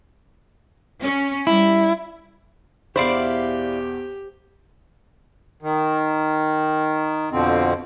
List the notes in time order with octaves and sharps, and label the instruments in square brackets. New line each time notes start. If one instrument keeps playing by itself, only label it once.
[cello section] C#4
[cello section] G3 [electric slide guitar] E4
[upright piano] E2 B2 [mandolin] E4 D5 F5 [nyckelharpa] G4 [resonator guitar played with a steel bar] C5
[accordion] D#3
F2 B2 D3 F3 C4